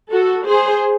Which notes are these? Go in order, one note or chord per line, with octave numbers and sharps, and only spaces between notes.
F#4 A4
G#4 C5